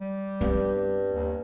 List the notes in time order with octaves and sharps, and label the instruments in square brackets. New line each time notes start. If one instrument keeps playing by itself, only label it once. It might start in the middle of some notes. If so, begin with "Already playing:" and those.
[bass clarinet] G3
[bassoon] G2 [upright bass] B3 C4
[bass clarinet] D#2